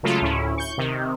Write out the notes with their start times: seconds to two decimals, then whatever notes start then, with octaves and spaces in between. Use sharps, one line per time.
0.03 C#3 F#3 G#3 A3 F4 A4
0.22 D2 A2 C#4 E4
0.58 C#6 G6
0.78 C3 D#3